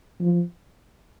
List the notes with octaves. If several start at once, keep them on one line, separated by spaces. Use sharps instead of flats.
F3